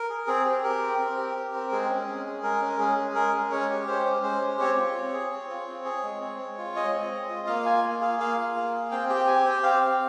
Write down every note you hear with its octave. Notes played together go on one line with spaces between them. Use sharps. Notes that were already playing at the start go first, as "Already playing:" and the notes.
Already playing: A#4
G#4
C4 G#4
G4
G4 A#4
C4
C4
G4
G4
C4
G#3 G#4
C#4
G#3
G#4
G#3 A#4
C#4
G#3 G#4
G#4
G#3 A#4
C#4
G#3 C#5
G4
G#3 C5
C#4
G#3 C5
G4
C4 C#5
F4
C4
G#4
C4
F4
C4
G#4
G#3
C4
G#3
F4
G#3 D#5
C4
G#3
F4
A#3 F5
F4 G#5
A#3
G#4 F5
A#3 F5
F4
A#3
G#4
C4 G5
G4 G5
G4 G#5
C4 G5
C4 F5
G4